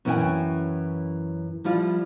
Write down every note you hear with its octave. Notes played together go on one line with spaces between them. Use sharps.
F#2 E3 C#4 E4 G5 G#5
F3 G3 E4 F4